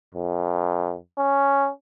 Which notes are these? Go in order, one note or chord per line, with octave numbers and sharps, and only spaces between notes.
F2
C#4